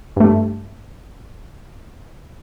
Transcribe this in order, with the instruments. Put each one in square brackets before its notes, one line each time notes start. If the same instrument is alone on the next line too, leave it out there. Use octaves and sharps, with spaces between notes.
[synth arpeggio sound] G2 A3